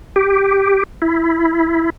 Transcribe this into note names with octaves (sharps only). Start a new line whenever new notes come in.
G4
E4